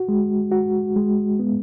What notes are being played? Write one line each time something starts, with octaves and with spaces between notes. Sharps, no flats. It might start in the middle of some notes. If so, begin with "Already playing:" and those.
Already playing: F#4
G#3
F#4
G#3
B3